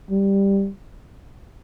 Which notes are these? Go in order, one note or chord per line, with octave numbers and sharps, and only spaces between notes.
G3